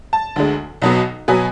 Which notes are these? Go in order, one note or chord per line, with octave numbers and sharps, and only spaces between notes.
A5
D2 D3 G#3
B1 B2 F#3 B3
B2 F#3 B3 G#5